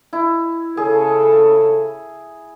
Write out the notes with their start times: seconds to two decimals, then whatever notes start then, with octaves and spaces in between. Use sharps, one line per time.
0.13 E4
0.77 C#3 G#4 A4